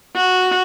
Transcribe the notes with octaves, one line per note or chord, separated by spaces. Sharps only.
F#4